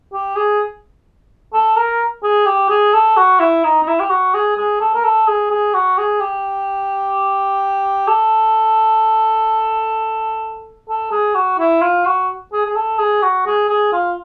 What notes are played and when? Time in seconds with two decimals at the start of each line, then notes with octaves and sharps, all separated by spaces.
0.13 G4
0.36 G#4
1.53 A4
1.77 A#4
2.23 G#4
2.46 G4
2.69 G#4
2.94 A4
3.17 F#4
3.40 E4
3.64 D#4
3.82 D#4
3.87 E4
4.00 G4
4.10 F#4
4.34 G#4
4.56 G#4
4.80 A4
4.94 A#4
5.04 A4
5.27 G#4
5.50 G#4
5.74 F#4
5.98 G#4
6.21 G4
8.08 A4
10.89 A4
11.11 G#4
11.35 F#4
11.59 E4
11.82 F4
12.05 F#4
12.52 G#4
12.65 G#4
12.76 A4
12.98 G#4
13.22 F#4
13.46 G#4
13.69 G#4
13.92 F4